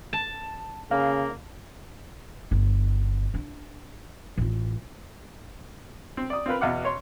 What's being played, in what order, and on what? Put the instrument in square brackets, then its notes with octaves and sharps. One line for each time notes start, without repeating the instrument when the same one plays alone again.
[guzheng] A5
[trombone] C#3 [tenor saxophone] A#3 [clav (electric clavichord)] F5
[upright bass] G1 E4
D4
A1 F4
[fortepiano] C4
D5 D#6
C4 F4 A#4 B4
E2 B2 F5 F#5 D6
C#5 C6